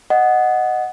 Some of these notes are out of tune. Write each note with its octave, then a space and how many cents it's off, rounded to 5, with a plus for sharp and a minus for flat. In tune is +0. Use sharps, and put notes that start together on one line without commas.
D#5 -5 F#5 +0